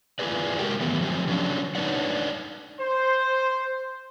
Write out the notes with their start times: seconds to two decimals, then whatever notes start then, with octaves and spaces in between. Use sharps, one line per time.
0.19 E4 F4 G4 G#4 B4 D5
0.59 G#3 A#3 F#4 G4 A#4 G5
0.80 D#3 E3 F#3 A3 B3
1.01 F3 F#3 C4 G4
1.28 D3 F#3 C#4 D4
1.75 D4 D#4 B4 C#5 D5 F#5
2.80 C5